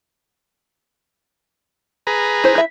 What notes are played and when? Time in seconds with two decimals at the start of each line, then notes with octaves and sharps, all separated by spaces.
2.07 G#4 B4 A#5
2.44 E4 C5
2.55 E4 E5